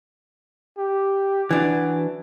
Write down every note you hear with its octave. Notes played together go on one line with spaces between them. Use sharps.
G4
E3 D4 F#4